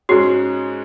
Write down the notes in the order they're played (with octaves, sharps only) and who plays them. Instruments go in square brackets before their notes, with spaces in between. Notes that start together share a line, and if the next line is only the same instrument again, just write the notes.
[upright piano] G#2 G#3 C#4 [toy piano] F#4